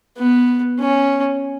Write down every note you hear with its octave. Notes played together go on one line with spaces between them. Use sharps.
B3
C#4